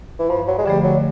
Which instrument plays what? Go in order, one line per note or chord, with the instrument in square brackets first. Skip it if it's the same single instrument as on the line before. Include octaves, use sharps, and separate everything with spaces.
[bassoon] E3
[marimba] G2 [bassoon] F3
[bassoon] F#3
G#3
[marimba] D3 F3 A3 [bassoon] G3
[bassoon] F#3